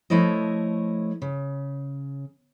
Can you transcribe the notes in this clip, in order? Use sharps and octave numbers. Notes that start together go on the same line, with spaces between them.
F3 A3 E4 C#5 D#5
C#3